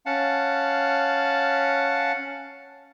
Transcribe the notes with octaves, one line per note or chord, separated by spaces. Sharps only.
C#4 F5 F#5 A5